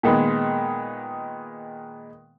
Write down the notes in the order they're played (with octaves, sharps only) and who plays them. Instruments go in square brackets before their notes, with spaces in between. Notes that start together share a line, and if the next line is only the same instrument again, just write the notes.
[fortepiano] A#2 D#3 G#3 B3